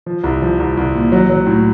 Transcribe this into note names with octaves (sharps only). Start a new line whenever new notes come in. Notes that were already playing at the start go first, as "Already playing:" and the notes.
F3
C2
F3
C2
C2
A#2
F#3
F#3
A2